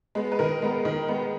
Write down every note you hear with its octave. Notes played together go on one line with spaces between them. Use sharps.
G#3 B3
B4
D#3 A#4
G#3 B3
D#3
G#3 B3